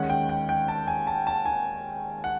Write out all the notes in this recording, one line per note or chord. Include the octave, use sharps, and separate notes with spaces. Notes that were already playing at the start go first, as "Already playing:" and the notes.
Already playing: D#2 D#3 G#3 C#4 F#5
G5
G5
G5
A5
G#5
A5
A5
G#5
F#5